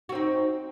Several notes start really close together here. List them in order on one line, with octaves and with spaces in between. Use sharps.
F#4 C4 D#4